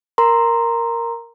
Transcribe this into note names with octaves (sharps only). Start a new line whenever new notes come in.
A#4 A#5 C6